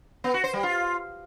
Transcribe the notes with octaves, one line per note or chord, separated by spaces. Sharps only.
B3
F#4
C5
G3
F4